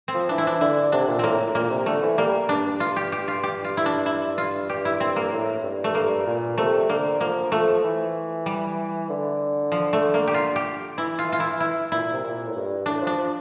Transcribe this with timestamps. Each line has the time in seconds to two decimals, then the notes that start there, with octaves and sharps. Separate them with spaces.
0.08 C4
0.14 F3
0.29 E3 D4
0.38 E4
0.47 D4
0.61 D3 E4
0.92 C3 D4
1.08 A#2
1.19 A2 A#3 C4
1.40 A2
1.55 A#2 A#3
1.70 C3
1.86 D3 A3
2.02 E3
2.18 G3 A#3
2.49 G2 D4
2.66 G2
2.80 G2 F4
2.96 G4
3.12 G4
3.28 F4
3.43 G4
3.65 F4
3.77 E4
3.86 D4
4.06 E4
4.38 F4
4.69 G2 G4
4.85 E4
5.00 C4
5.16 A#3
5.32 A2
5.63 G2
5.84 A3
5.95 G2 A#3
6.26 A#2
6.58 C3 A3
6.89 D3 A#3
7.21 F3 A#3
7.52 F3 A3
7.84 E3
8.46 G3
9.10 D3
9.72 F3
9.93 A3
10.14 A#3
10.27 G4
10.34 F4
10.56 G4
10.98 E3 E4
11.19 F4
11.29 E3 F4
11.40 E4
11.60 E4
11.92 A#2 E4
12.13 C3
12.23 A#2
12.48 A2
12.55 G2
12.86 A2 D4
13.01 F3
13.07 D4
13.17 F3